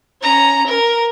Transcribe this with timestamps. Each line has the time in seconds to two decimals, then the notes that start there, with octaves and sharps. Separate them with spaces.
0.22 C#4 A#5
0.67 A#4